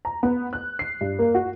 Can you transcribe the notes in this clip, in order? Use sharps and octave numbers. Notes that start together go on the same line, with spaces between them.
A#5
B3
F#6
C7
G2
A#3
F#4